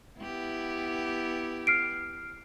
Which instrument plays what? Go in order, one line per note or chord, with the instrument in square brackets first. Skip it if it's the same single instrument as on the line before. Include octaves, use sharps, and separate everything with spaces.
[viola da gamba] B3 E4 G4
[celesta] F6 C7 D7